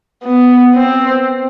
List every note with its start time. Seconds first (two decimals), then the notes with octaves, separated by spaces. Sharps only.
0.24 B3
0.75 C4